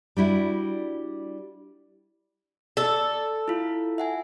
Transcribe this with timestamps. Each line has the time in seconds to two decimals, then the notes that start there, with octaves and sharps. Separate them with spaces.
0.17 G3 D4 E4 F#4
2.77 A4 D5
3.48 E4 F4
3.98 E5 F#5 G#5